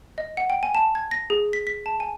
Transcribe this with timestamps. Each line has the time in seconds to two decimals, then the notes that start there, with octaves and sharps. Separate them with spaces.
0.18 D#5
0.37 F#5
0.50 G5
0.63 G#5
0.75 A5
0.95 G#6
1.11 A#6
1.30 G#4
1.53 B6
1.67 B6
1.86 A5
2.00 G#5